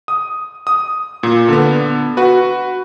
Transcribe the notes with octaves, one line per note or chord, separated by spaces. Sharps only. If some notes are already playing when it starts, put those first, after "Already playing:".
D#6
D#6
A#2
D3 B3
F#4 B4